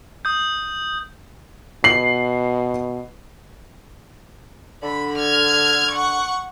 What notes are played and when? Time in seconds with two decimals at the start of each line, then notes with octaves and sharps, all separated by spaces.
0.25 D#6 G6
1.84 B2 C7 F#7
4.83 D3 B5
5.18 F6 G#6
5.91 F#5 C#6